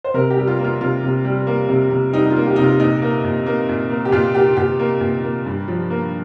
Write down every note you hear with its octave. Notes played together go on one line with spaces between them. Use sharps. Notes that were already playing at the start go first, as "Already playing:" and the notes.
C5
C3 A#4
G4
G3
F4
A#3
F4
C3 F4
C3
G3
A#3
C3
C3
G3 D#4
D#4
F4
A#3
G4
C3 D#4
F4
A#2 D#4
A#3
A#2
A#3
A#2
A#3
G4
A#2 F4
A#3 G4
A#2 G4
A#3
A#2
A#3
G2
F3
A#3